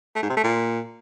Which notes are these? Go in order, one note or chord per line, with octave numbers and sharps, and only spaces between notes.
A3
G#2
C3
A3
A#2